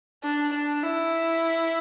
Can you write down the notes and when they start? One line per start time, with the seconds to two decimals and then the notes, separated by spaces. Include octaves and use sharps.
0.23 D4
0.53 D4
0.83 E4